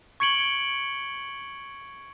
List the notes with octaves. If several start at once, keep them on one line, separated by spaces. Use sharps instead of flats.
C#6 G#6 C#7 D7 F#7 G7